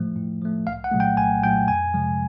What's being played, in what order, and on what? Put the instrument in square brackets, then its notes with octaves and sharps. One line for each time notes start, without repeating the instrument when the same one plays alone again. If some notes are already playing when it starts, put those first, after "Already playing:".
Already playing: [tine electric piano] A2 F3 A3
A2
F3 A3
C2 F5
F#5
A#2 F#3 A3
G5
C2 G#5
A#2 F#3 A3 G5
F2 G#5
C3 F3 G#3